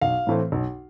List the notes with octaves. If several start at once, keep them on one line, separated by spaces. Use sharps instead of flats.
B1 F5
A2 E3 A3 C4
B1